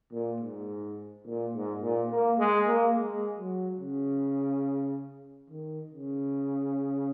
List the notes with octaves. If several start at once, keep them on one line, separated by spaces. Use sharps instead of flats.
A#2
G#2
A#2
G#2
A#2
A#3
G#3
A#3
G#3
F#3
C#3
D#3
C#3